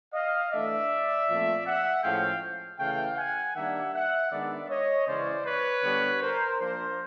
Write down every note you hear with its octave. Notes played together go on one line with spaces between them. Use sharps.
D#5 F5
E3 A3 D4 D5 E5
A#2 F3 A3 C4
E5 F#5
A2 F3 G#3 C#4 F5 G5
C#3 E3 A3 F5 G5
F#5 G#5
D#3 G3 A#3 D4 E5 F#5
E5 F#5
D#3 G#3 B3 D4 D5 E5
C#5 D#5
C#3 E3 G#3 C#4 C5 D5
B4 C#5
D3 G3 B3 D4
A#4 C5
F3 A#3 D4 A#4 C5